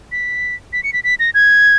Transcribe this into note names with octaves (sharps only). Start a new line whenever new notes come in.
B6
B6
C#7
B6
B6
A#6
G#6